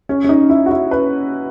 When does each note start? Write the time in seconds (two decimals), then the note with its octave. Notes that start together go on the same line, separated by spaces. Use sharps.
0.09 C#4
0.24 C#4
0.29 D#4
0.49 E4
0.66 F#4
0.71 E4
0.91 B4